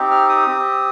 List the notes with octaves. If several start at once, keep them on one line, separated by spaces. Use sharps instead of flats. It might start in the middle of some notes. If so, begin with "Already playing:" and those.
Already playing: C4 D#4 G4
F6
D#6
C4 G4